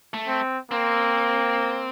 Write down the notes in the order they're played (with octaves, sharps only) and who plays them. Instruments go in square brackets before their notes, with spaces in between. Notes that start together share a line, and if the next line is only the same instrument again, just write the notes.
[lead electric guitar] A3
[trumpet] C4
[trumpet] A#3 [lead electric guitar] C4